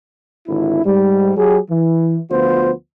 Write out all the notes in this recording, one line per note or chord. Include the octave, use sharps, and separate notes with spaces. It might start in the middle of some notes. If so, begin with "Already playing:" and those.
G#1 D3 E4
G#2 G3
F#3 G4 G#4
E3
D2 F3 B3 F4 C5